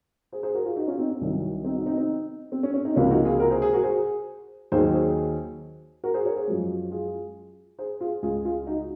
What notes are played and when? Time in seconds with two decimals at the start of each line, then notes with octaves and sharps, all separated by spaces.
0.32 G#4 C5
0.43 G#4 C5
0.55 F#4 A#4
0.65 F4 G#4
0.76 D#4 F#4
0.88 C#4 F4
0.99 C4 D#4
1.10 C#4
1.21 C2 C3 D#3 F#3
1.64 C4 D#4
1.75 D#4 F#4
1.86 C4 D#4
1.97 C4 D#4
2.52 C4
2.63 C#4
2.74 C#4
2.85 C4 D#4
2.96 C#2 C3 F3 A#3 C#4 F4
3.10 D#4 F#4
3.25 F4 G#4
3.40 F#4 A#4
3.50 G#4 C5
3.62 G#4 C5
3.73 F#4 A#4
3.84 G#4 C5
4.72 D#2 D#3 F#3 G#4 C5
4.93 G#4 C5
6.04 F#4 A#4
6.14 G#4 C5
6.25 A#4 C#5
6.36 G#4 C5
6.48 F#2 F3 G#3
6.91 F4 G#4
7.79 G#4 C5
8.01 F4 G#4
8.22 C#2 C#3 G#3 F4 G#4
8.45 F4 G#4
8.66 D#4 F#4